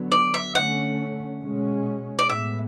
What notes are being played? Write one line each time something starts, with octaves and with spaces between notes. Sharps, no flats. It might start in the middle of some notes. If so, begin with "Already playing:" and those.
Already playing: D3 F#3 B3
D5
E5
D3 A3 C#4 F#5
B2 G#3 C#4
D5
A2 G#3 B3 E5